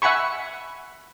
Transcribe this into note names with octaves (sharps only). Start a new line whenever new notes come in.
E5 F#5 G#5 B5 C#6